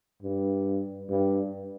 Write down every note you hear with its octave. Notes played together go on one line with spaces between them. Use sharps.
G2
G2